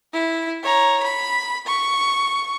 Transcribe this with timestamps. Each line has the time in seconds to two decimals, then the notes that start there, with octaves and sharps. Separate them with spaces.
0.13 E4
0.64 C#5 A#5
1.03 B5
1.67 C#6